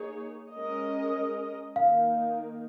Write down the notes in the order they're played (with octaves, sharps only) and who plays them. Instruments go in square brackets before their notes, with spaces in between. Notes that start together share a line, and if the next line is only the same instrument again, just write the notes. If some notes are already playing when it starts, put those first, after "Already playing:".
Already playing: [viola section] A#3 D#4 G#4 C#5
G#3 C#4 A#4 D#5
[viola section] D#3 A#3 D#4 [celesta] F5